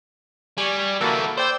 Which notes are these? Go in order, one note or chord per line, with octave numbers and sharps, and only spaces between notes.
G3 G#5 C#6
D#3 A#3 E4 F#4 A4
C5 D5 G5 E6